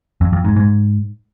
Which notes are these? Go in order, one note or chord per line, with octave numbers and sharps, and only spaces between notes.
F2
F2
G#2
G#2